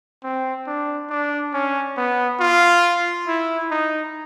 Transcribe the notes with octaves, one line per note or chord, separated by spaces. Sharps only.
C4
D4
D4
C#4
B3
F4
E4
D#4